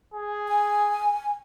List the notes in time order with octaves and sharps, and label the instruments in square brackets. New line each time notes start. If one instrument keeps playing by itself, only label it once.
[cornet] G#4
[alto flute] G#5